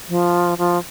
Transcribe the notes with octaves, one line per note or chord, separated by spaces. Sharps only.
F3
F3